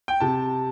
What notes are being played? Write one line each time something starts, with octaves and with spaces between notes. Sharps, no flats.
G5
C3 A5